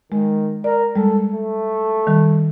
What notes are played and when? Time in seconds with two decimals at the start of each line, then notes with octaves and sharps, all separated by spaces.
0.12 D#3 G#3
0.64 A#4 D5
0.96 G3 G#3 A4
1.33 A3
2.07 D#3 G3